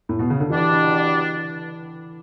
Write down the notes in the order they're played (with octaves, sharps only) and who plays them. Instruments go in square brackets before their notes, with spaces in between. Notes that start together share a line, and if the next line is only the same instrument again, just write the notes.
[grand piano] A2
B2
C#3
D3
[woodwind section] B2 G3 D4 [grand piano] E3